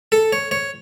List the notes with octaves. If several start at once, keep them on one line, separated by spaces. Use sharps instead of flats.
A4
C#5
C#5